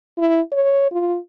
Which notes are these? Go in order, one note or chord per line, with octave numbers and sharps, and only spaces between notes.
E4
C#5
F4